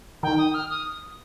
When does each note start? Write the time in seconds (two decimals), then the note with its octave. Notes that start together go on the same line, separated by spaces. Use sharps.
0.23 D#3 G5
0.38 D#6
0.54 F6
0.70 D#6